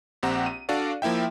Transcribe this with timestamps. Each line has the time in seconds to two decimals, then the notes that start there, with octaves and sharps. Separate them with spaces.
0.23 A#1 C4 G4 F#5 A#5
0.46 D#7
0.69 D4 F#4 A4 D5 F5
1.02 F3 A#3 E4 E5 G5